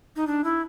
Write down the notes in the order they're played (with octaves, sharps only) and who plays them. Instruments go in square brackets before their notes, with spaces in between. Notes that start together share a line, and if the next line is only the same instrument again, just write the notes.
[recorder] D#4
D4
E4